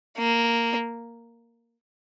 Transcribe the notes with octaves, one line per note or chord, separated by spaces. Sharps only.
A#3